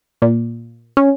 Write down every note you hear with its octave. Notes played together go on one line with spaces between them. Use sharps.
A#2
C#4